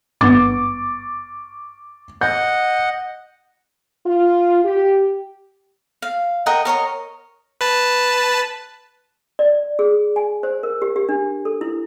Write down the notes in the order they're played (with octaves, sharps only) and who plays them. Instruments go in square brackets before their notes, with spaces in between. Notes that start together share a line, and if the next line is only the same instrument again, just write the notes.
[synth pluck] G#1 G2 B3 [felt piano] C#6 D6 A6
[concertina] D#5 F#5 [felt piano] G6
[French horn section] F4
G4
[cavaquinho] F5
A#4 D#5 F#5 G5
A#4 C#5 D#5 A#5
[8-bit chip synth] B4 A5
[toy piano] D5
G#4
G#5
C5
A#4
G4
G4
D4
A4
E4